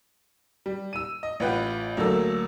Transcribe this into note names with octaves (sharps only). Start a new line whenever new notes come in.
G3
E6 D#7
D#5
A1 F4 B4 F#5 G5 G6
D2 F#3 A#3 A4 E6